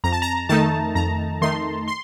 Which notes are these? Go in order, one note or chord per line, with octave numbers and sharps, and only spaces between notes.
F2 A#5
A5
A#5
D#3 A3 D#4 A5
F2 A#5
D#3 A3 D#4 C6
C6